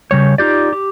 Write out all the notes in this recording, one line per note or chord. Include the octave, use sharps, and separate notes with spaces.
C#3 G3 C#5
D#4 F4 G4 D5
G4